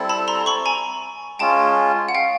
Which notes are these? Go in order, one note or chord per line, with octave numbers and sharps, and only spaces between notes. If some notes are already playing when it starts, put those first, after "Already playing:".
Already playing: G3 C4 E4 A4
A5 B5
A#5 C6
B5 C#6
G#5 A#5
G#3 C#4 F4 G5 A5
F#5
F5 G5